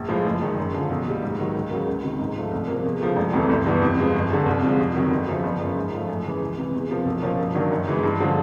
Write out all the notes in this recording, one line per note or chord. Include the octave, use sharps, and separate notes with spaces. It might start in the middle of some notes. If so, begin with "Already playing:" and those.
Already playing: A#1
A2 F3 G#3
F#1
F#2 D#3 G#3
F#2
D3 F3
B1
A#2 G3
G#2
D#3 F#3
C#2
C#3 F#3 A#3
C#2
C3 D#3
G#2
F3 A3
C2
C3 F3 A#3
E2
C#3 F3 A3
E1
D2 C3 E3 A3
G1
G2 E3 G3 B3
F2
C3 F3 G#3
G1
F#2 D3
C2
C3 F3 G#3
F2
C3 D#3 F#3
G1
F#2 C#3 F3
G1
F#2 C#3 F3 A#3
G#2
F3 A3
F#2
C#3 E3 G#3
C#2
C3 E3
E2
C3 F3 A#3
B1
A#2 F3 A#3 C#4
G2
D#3 F#3 A#3 D4
F#2
C#3 E3 G#3
G2
D3 F3 G#3